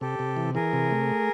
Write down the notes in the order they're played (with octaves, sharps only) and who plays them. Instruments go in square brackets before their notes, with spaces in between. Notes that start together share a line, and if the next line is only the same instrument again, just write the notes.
[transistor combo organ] C3 [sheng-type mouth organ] G4 A4
[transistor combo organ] C3
E3
[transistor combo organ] E3 [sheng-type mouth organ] G#4 A#4
[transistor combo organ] C3
A3